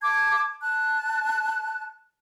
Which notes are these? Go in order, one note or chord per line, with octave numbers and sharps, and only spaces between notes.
A5 D6 G#6
A5 F#6